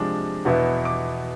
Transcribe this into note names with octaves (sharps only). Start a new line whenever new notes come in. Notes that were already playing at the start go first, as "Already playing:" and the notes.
Already playing: C3 F3 G#3 D4
E2 B2 B3 E4
D6